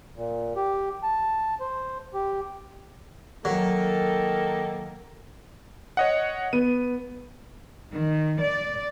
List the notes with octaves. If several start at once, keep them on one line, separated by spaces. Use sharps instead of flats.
A#2
G4
A5
C5
G4
D#3 F#3 A#3 A4
C#5 D#5 F#5
B3 D#7
D#3
D5